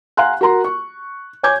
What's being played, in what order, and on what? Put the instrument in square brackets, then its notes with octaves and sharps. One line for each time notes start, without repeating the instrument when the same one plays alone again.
[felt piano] F5 F#5 G#5 A#5 C6 F#6
F#4 A#4 A#5 C6
C#6
C#5 G#5 D6 G6 G#6